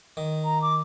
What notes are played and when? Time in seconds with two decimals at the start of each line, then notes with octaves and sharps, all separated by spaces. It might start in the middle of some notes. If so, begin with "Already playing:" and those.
0.17 D#3
0.44 A#5
0.61 D6